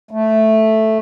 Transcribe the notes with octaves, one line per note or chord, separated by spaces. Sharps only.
A3